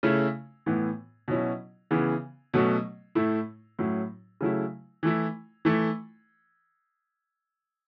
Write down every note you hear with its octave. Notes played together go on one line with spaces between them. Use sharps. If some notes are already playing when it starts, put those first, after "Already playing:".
C#3 A3 C#4 E4
A2 E3 B3
B2 F#3 C#4 E4
C#3 E3 B3
B2 F#3 A3 C#4
A2 A3 E4
A2 F#3 C#4 E4
C#3 F#3 A3 E4
E3 A3 E4
E3 A3 E4